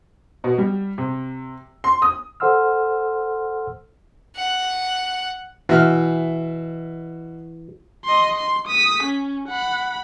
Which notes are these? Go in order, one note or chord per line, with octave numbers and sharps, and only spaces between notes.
B2
G3
C3
C6
D#6
A4 C5 F#5 C6 E6 F6
F#5
B2 E3 E5 F6
D#5 C6
C6
D#6 B6
C#4
F#5 B5